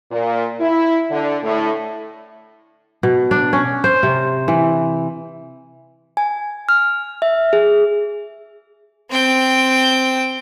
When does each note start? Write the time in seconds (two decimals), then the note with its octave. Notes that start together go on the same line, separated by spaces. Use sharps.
0.12 A#2
0.60 E4
1.11 D3
1.44 A2
3.03 B2
3.31 D4
3.53 C#4
3.84 C5
4.03 C3
4.48 E3
6.17 G#5
6.69 F6
7.22 E5
7.53 G#4
9.10 C4 G5